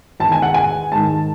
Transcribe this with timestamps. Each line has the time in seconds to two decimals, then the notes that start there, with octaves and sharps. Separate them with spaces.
0.20 E2 D#3 A5
0.32 G#5
0.42 F#5
0.54 G#5
0.92 G#2 D#3 A5